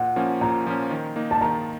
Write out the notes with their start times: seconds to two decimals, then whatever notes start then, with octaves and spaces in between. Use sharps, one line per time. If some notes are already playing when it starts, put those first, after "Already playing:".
Already playing: A#2 F#5
0.16 F3 A#3 C#4
0.41 A#2 A#5
0.67 F3 A#3 C#4
0.91 D#3
1.16 A#3 D#4
1.31 A5
1.41 D#3 A#5